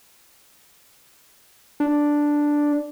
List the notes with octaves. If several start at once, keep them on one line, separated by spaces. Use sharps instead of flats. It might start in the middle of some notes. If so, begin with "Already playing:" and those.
D4